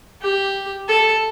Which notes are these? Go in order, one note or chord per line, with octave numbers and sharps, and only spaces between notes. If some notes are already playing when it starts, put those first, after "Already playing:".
G4
A4